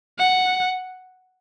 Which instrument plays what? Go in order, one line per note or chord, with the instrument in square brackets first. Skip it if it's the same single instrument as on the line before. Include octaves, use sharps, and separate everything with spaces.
[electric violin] F#5